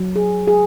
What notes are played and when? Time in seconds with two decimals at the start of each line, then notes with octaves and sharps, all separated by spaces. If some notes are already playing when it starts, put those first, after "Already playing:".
Already playing: F#3
0.16 G#4
0.47 G#4